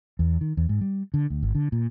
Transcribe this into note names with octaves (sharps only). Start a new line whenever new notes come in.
E2
D#3
E2
G#2
G3
D3
D2
G#1
D3
A#2